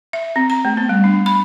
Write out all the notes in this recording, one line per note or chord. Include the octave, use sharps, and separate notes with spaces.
E5
C4
A#5
A3
B3
G3
D4
B5